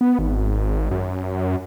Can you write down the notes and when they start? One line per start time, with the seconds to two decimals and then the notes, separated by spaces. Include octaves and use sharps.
0.01 B3
0.19 G#1
0.91 F#2